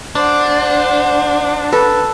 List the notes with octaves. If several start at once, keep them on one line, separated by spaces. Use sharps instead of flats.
D4 C5 F#5
A4 B4